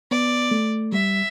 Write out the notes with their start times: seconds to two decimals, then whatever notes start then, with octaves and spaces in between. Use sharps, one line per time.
0.11 B3 D5
0.51 A3
0.92 G3 E5